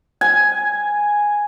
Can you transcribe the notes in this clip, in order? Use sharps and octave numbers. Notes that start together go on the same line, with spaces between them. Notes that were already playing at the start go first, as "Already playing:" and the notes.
G#5